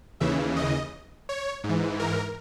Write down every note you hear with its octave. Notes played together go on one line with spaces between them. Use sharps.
D#2 C#3 E3 E5
D#5
C#5
G#2
E3
A#4